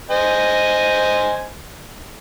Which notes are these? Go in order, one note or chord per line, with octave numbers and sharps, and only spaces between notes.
C5 D#5 G#5